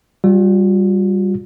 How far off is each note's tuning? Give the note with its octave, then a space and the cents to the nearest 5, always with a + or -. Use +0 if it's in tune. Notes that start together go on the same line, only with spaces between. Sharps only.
G3 +0 F4 +40